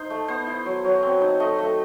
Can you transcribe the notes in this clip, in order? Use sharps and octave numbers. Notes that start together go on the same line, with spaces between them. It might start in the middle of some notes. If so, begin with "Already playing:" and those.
Already playing: D#4 C5
A3
B3 C5
E4
F#3
F#3
C4
D#4
A3 D#5
A3